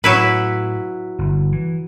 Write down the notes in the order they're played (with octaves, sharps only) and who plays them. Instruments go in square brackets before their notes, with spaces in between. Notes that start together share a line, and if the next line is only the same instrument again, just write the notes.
[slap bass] A2 [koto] F#3 E4 B4
[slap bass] G1
E3